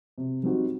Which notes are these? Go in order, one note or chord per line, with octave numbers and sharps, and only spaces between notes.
C3
G3 C4 D#4 F#4